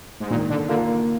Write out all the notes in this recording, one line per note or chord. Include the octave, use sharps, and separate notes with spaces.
G#2
A#2 D#3
D3
D3 A#3 F4